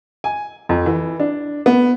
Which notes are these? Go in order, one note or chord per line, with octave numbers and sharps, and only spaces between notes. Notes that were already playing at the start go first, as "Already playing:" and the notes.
G#5
F2
E3
D4
B3